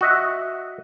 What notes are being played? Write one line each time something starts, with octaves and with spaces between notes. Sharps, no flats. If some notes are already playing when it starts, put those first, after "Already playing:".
F#4 D#5 E5